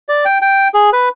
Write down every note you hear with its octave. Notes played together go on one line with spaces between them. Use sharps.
D5
G5
G5
G#4
B4